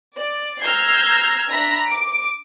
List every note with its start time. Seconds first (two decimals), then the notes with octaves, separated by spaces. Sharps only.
0.16 D5
0.61 A#5 E6 F6 G6 G#6 C7
1.50 D4 E5 A#5 B5 A#6 B6
1.87 D6 D7